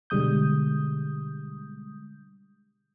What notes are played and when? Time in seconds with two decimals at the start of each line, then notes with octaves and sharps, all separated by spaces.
0.10 B2 D3 G3 G#3 D#6 G6